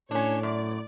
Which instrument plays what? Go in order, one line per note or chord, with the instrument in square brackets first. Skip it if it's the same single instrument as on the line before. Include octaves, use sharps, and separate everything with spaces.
[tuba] A2 [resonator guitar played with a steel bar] C#4 D4 [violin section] C#5
[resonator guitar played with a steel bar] F#2 [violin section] D5